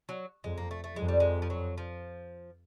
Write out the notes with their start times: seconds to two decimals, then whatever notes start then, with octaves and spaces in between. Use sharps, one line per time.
0.09 F#3
0.44 F2 G#3
0.58 A#3
0.71 A3
0.84 A3
0.96 F2 G#3
1.08 G3
1.20 G#3
1.42 F3
1.50 F#3
1.78 F3